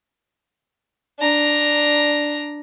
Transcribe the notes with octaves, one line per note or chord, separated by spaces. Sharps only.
D4 A#5